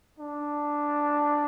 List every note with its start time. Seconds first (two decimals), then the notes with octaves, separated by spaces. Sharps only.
0.19 D4